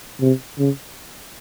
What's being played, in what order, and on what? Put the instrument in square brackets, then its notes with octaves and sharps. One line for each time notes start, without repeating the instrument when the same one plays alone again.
[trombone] C3
C#3